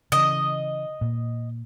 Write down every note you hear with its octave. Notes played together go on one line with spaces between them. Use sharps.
C#3 E3 D#5
A#2